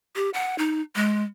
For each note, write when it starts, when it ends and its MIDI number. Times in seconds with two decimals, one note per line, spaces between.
0.16 0.30 67
0.34 0.56 78
0.58 0.81 63
0.95 1.23 56